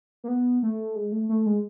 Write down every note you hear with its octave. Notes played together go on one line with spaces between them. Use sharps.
A#3
B3
A3
G#3
A3
A3
G#3